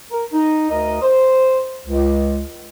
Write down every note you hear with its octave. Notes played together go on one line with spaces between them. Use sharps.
A#4
D#4
D2 A#4 D#5
C5
C#2